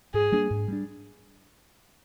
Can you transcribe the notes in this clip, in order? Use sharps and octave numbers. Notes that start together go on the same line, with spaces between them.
G#2 G#4
G3 A#3 D4
G#2
G3 A#3 D4